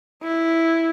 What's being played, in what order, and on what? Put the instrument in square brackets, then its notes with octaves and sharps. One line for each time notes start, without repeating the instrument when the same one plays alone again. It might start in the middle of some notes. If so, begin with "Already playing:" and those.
[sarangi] E4